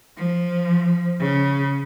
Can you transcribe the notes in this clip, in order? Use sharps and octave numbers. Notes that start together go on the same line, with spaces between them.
F3
C#3